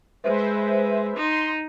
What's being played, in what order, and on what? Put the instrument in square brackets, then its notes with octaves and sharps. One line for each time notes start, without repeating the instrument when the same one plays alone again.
[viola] G#3 [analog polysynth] B4 C5 E5
[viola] D#4 [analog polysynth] C6